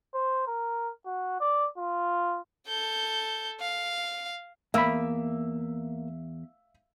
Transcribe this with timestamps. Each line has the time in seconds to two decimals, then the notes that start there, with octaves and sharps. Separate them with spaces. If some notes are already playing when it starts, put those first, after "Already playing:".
0.14 C5
0.48 A#4
1.06 F#4
1.41 D5
1.78 F4
2.68 A4 G6
3.61 F5
4.74 E2 A#3 E5 F5 B5 E6